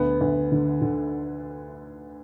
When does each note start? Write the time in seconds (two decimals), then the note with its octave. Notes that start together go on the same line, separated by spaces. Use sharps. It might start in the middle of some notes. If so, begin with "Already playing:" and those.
Already playing: D2 B3
0.21 D2
0.52 D3
0.82 D3